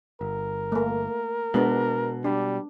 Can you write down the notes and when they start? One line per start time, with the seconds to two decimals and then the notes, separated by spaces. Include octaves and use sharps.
0.21 G1 A#4
0.72 A3 A#3
1.54 B2 G#3 B3 D4
2.24 G3 D4